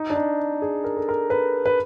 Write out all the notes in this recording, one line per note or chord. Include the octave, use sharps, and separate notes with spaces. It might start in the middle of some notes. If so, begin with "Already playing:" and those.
Already playing: D#4
D4
D#4
G#4
A#4
A4
A#4
B4
B4